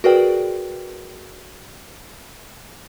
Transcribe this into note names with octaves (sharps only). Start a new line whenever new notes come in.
F#4 G#4 A#4 B4 D5 G5